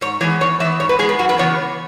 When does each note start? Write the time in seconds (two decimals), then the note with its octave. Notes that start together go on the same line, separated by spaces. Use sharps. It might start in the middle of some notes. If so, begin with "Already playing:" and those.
0.01 G#2 C#5
0.21 E3 G#3 B3 C#5
0.41 E2 C#5
0.60 E3 E5
0.64 B3
0.80 G#2 C#5
0.89 B4
0.99 G#3 G#4
1.02 B3
1.09 B4
1.19 F#2 F#4
1.29 B4
1.38 C#3 E3 B3 C#5